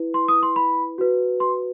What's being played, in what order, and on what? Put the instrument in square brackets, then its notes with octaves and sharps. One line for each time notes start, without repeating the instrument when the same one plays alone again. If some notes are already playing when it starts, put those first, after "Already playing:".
Already playing: [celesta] E4 B4
C6
D#6
C6
B5
F#4 B4
C6